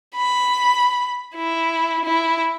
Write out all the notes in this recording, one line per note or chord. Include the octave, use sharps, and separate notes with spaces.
B5
E4
E4